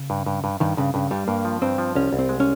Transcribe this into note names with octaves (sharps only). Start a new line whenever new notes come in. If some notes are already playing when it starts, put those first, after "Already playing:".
Already playing: C#3
G2
G2
G2
G2 D#3
G2 C#3
G2 C#3
G2 G3
G2 A#3
F3
G2 C4
F3
C2 C#4
C2
C4
G#3
C#4